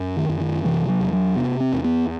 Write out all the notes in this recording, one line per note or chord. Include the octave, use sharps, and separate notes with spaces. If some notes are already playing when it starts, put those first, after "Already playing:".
Already playing: F#2
D#3
F#2
D#3
C3 E3
F#3
E2
F#3
C3 B3
C4
E2
B3